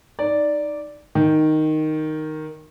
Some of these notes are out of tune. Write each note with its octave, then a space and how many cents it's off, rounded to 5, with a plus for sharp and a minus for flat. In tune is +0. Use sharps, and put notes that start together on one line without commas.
D#4 +0 D5 -5
D#3 +0 G5 +0